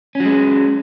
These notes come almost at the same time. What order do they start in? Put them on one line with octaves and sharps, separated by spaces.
C#4 F#3 G#3